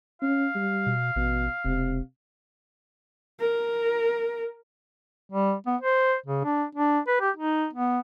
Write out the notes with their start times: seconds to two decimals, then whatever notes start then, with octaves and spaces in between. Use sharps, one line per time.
0.22 C#4 F5
0.55 G3
0.86 B2
1.16 A1 B2
1.65 E1 C3
3.40 A#4
5.30 G3
5.67 B3
5.81 C5
6.26 C#3
6.44 D4
6.75 D4
7.08 B4
7.21 G4
7.37 D#4
7.73 B3